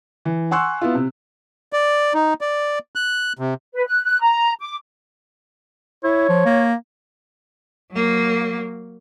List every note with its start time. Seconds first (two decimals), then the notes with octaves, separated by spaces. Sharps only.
0.25 E3
0.51 F#5 G#5 C6 C#6 E6 F#6
0.81 B3 E4 F4
0.95 C3
1.73 D5
2.14 D#4
2.41 D5
2.96 F#6
3.39 C3
3.74 B4
3.86 F#6
4.04 F#6
4.22 A#5
4.60 D6
6.04 E4 C#5
6.29 F3
6.45 A#3
7.92 F#3 A#3